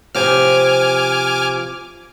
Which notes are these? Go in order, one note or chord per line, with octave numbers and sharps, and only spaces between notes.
C3 F3 C4 G#5 D6 F6